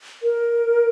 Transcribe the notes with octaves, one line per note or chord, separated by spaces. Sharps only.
A#4